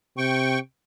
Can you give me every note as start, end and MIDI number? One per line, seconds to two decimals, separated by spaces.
0.18 0.58 48
0.18 0.59 79
0.18 0.59 85